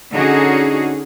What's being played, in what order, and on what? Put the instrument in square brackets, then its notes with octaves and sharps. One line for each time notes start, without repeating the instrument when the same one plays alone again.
[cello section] D3 C#4 D#4 F#4 G#4